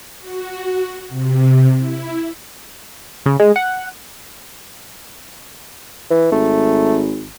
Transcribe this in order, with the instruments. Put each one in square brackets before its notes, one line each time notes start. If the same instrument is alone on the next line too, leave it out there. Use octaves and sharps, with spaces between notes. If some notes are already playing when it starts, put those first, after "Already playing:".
[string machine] F#4
C3
E4
[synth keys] C#3
G#3
F#5
[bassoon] E3
[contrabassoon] G#1 [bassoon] A3